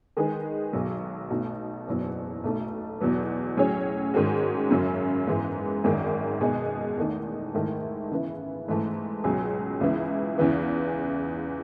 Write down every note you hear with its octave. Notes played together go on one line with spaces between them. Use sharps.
D#3 G#3 D#4 G#4 B4
B1 B2 F#3
B1 B2 A3 D#4 F#4
F#1 E2 B2 F#3
B1 B2 A3 D#4 A4
E2 B2 F#3 B3
A2 F#3 C#4 G#4 C#5
G#2 D#3 G#3 C#4 F#4
F#2 C#3 F#3 C#4
G#2 E3 G#3 B3
G#1 F#2 D#3 G#3
B2 G#3 D#4 G#4 D#5
E2 D#3 A3 D#4
G#2 D#3 A3 E4
C#3 E3 B3 E4
G#2 E3 A3
C#2 B2 F#3 C#4 G#4
C#2 C#3 E3 B3 E4
E2 C#3 E3 B3